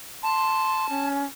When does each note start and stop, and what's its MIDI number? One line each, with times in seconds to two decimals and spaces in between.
0.23 1.09 81
0.23 0.86 84
0.90 1.24 61